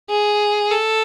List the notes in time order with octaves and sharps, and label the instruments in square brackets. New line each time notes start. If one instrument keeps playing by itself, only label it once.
[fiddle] G#4
A4